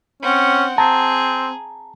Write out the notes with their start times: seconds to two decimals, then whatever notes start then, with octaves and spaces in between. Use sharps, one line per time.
0.22 C4 C#4 F#5
0.78 C4 G#4 A5 A#5